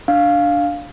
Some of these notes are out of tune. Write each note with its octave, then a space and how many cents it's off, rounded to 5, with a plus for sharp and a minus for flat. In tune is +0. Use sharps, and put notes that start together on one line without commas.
D4 +0 F5 +0